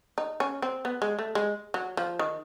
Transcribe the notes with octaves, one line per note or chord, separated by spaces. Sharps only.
D#4
C#4
C4
B3
G#3
A3
G#3
F#3
F3
D#3